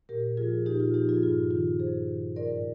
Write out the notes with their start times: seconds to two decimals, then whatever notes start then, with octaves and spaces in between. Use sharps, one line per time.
0.09 A#2 G4 A#4
0.37 F3 F4 G#4
0.66 A#2 D#4 G4
0.80 F4
0.94 F3 D#4 G4
1.09 F4 G#4
1.23 G2 F4
1.51 D#3 F4
1.79 G2 G#4 C5
2.08 D#3
2.36 G#2 A#4 D5